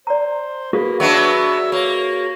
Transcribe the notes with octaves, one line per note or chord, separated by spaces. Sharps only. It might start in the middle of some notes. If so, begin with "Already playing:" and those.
C5 D5 A#5
A#3 F#4 G#4 B4
F#3 B3 D4 G4 E5 C#6
A#3 C#5